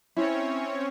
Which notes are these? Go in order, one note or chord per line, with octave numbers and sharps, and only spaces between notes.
C4 C#4 E4 C#5